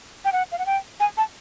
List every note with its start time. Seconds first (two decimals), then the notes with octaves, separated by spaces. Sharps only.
0.25 G5
0.33 F#5
0.52 F5
0.59 F#5
0.66 G5
1.00 G#5
1.17 A5